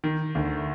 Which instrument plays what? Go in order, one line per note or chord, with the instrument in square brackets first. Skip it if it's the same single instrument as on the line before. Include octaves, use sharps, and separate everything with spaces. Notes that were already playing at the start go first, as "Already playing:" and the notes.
[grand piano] D#3
D2